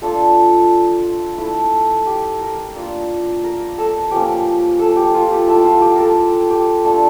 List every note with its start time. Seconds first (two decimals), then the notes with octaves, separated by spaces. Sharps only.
0.02 A3 D4 F4 A4
1.38 A3 E4
2.06 G4
2.41 A#4
2.74 A#3 D4 F4
3.44 A#4
3.78 A4
4.11 F3 A#3 C#4 G4
4.79 A4
4.96 G4
5.14 F4
5.31 G4
5.48 A3 E4 A4
5.65 F4
5.82 G4
5.96 A4 A#4
6.50 G4
6.84 A3 D4 F4 A4